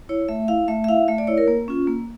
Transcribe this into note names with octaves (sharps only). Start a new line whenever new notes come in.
E4 C#5
A3 E5
E4 F5
A3 E5
E5
E4 F5
A3 E5
D5
E4 C#5
A#4
A#3
C#4 F4
A#3